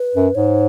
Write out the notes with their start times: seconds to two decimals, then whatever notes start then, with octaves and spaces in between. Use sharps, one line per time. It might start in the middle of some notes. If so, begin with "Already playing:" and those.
Already playing: B4
0.15 F#2
0.34 G#2 C#5